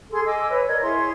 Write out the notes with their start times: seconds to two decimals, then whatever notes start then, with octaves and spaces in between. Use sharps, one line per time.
0.11 G#4 A4 C6
0.26 D#5 G#5 D6 E6
0.49 B4 C#5
0.66 A#4 D5 D#5 G#6
0.81 E4 G#4 C#5 C6